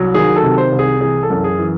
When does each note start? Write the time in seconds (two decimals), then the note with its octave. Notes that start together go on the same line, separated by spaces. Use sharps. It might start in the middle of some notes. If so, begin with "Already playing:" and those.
Already playing: C2 F#3
0.14 D#3 G#4
0.36 A4
0.43 C3
0.58 C5
0.72 C2
0.79 G#4
1.01 E3 G#4
1.23 A4
1.30 F#2
1.44 G#4
1.59 E3